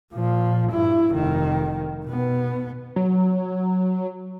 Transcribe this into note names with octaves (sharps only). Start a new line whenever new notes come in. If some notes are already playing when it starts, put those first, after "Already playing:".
A#2 F3
G2 E4
F1 D#3
B2 B3
F#3